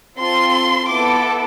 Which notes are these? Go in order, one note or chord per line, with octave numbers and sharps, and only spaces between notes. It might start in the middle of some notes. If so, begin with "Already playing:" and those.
C4 F4 A4 C6
B3 E4 A4 D6